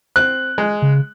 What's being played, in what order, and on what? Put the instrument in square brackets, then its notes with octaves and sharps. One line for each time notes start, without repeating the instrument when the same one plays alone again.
[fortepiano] C4 [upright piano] F#6
[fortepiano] G#3
[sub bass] C#3